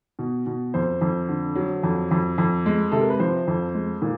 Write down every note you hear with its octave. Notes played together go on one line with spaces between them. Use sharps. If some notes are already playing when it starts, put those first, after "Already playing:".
B2
B2
F2 C5
F2
D3
F#3
F2
F2
F2
G#3
C3 A4
A#4
B4
F3 C5
F2
G#3
A#2